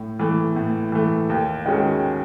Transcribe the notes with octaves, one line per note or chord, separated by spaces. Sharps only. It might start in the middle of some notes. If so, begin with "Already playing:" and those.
Already playing: A2
E3 A3
A2
E3 A3
D#2
D#3 G#3 C#4 F#4